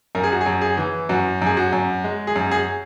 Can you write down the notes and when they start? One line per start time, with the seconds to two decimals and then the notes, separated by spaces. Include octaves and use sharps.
0.15 F#2 A#4
0.24 G#4
0.32 F#4
0.41 G#4
0.46 F#2
0.61 G#4
0.78 E3
1.09 F#2 F#4
1.42 F#2 G#4
1.57 F#4
1.72 F#2
2.04 G#3
2.27 G#4
2.36 F#2
2.51 G#4